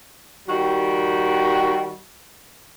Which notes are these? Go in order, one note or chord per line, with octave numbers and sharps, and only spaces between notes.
D#3 G3 F#4